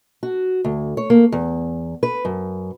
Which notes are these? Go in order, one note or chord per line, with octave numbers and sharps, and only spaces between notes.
F#4
D2
C#5
A#3
E2
B4
F#2